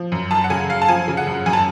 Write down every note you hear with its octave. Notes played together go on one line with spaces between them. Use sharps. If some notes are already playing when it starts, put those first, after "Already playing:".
Already playing: F3
F#2
F#2 A5
F#5
C#3 G#5
F#2 F5
A5
F3 G#5
C#3
F#5
F#2
F#2 G#5
A5